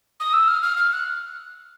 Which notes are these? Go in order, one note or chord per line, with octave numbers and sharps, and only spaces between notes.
D#6
E6
F6
F6
F6
F#6